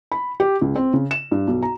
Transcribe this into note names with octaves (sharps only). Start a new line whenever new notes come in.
B5
G4
C#2
C4
C#3
E7
G2
B1
A#5